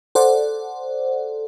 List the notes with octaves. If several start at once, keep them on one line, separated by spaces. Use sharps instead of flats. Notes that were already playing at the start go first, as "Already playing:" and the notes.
A4 C5 D5 F#5